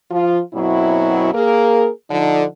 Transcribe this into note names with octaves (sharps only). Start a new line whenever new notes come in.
F3 F4
F#2 B2 F#3 C4 E4
A#3 G#4 A#4
D3 F3 D#4